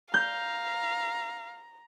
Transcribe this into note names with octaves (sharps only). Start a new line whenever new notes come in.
F5 A#5 G6